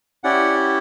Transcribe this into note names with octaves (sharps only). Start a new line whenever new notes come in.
C#4 E4 G4 D5 F#5